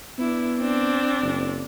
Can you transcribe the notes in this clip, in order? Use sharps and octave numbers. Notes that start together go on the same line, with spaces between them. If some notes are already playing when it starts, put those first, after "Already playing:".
B3 D4 E4
C4 D4
F#1